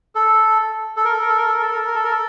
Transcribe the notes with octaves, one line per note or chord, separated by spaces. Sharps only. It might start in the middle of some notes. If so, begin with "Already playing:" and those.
A4
A4
A#4
A4
A#4
A4
A#4
A4
A#4
A4
A#4
A4
A#4
A4
A#4
A4